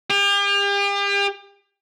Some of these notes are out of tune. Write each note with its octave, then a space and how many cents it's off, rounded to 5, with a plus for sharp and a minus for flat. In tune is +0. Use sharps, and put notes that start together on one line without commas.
G4 +40